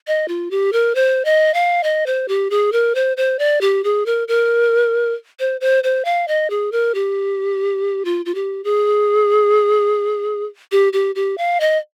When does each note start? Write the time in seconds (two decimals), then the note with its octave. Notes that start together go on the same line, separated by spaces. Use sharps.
0.07 D#5
0.28 F4
0.51 G4
0.73 A#4
0.95 C5
1.25 D#5
1.54 F5
1.83 D#5
2.06 C5
2.28 G4
2.50 G#4
2.72 A#4
2.95 C5
3.17 C5
3.39 D5
3.61 G4
3.84 G#4
4.06 A#4
4.28 A#4
5.39 C5
5.61 C5
5.84 C5
6.05 F5
6.28 D#5
6.50 G#4
6.72 A#4
6.94 G4
8.05 F4
8.26 F4
8.35 G4
8.64 G#4
10.72 G4
10.93 G4
11.15 G4
11.38 F5
11.60 D#5